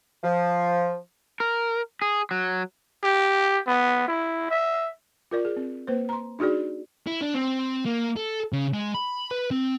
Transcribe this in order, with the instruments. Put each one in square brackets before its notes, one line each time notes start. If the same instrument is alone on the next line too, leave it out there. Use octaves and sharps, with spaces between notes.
[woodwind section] F3
[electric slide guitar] A#4
G#4
F#3
[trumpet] G4
B3
E4
E5
[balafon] F4 A#4 D5
G#4
C4
A#3 B4 C5
A#5 C6
D4 D#4 F#4 G#4 D5
[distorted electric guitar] E4
D4
C4
A#3
A4
C#3
G#3
B5
B4
C4